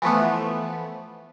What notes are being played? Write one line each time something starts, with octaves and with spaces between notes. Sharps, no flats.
E3 F3 A3 B3